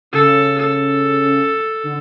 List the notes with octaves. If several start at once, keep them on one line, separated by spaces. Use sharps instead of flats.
C#3 A4
A4
D3